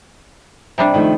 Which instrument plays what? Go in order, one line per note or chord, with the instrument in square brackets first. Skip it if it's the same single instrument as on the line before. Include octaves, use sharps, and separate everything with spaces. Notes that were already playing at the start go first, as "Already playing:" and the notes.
[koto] C3 G3 D4
[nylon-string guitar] D#3 F3 A3